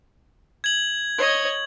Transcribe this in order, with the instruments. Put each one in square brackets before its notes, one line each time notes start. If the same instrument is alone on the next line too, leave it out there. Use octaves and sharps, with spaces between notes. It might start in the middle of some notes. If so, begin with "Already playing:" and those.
[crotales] G#6 F#7
[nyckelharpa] C#5 D#5